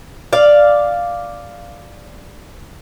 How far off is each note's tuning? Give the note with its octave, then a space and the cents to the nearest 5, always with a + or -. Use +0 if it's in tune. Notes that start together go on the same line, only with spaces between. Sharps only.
D5 +0 F5 +0